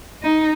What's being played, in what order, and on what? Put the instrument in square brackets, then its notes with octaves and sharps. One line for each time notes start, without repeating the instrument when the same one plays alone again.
[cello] D#4